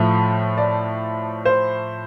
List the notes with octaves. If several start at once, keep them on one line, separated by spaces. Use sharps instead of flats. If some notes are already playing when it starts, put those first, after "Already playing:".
Already playing: A2 F3 A3
D5
C5